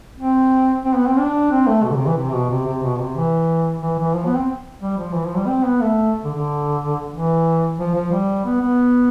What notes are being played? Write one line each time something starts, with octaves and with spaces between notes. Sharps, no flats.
C4
C4
B3
C4
D4
C4
A3
B2
D3
C3
E3
C3
B2
C3
C3
B2
C3
E3
E3
E3
F3
B3
C4
G3
F3
E3
F3
G3
C4
B3
A3
D3
D3
E3
F3
F3
G3
B3
B3